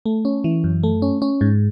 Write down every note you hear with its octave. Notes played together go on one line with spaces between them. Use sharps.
A3
C#4
E3
F#2
A3
C#4
C#4
G#2